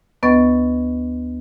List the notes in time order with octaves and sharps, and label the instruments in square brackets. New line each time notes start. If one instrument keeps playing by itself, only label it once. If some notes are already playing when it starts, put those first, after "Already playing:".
[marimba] D2 B3 B4 D#5 C#6 A6